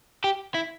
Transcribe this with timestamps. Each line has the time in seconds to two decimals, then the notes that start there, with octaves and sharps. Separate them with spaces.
0.24 G4
0.55 E4